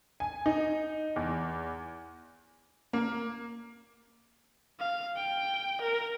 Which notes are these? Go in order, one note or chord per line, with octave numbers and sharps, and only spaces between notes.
G#5
D#4
E2
A#3
F5
G5
A#4